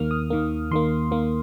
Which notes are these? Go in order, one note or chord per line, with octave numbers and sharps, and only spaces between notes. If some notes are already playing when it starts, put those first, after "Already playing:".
Already playing: D#2 D#3 A#3 F6
D#6
D#2 D#3 A#3
D#2 D#3 A#3 C6
D#2 D#3 A#3